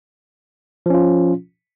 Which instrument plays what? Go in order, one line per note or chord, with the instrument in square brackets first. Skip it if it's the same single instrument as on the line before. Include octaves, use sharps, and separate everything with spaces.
[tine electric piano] F3
C#4
F4